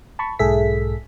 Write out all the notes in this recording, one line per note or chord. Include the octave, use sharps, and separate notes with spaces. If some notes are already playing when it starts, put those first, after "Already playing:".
A5 B5 C#6
B1 G#2 G#4 A4 E5 B6